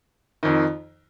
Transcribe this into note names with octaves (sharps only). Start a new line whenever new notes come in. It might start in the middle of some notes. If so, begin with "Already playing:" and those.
F2 D#3